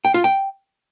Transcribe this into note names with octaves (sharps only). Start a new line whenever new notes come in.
G5
F4
G5